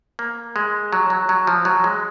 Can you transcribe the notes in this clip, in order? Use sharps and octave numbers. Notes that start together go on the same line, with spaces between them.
A#3
G#3
F#3
F#3
F#3
F3
F#3
G#3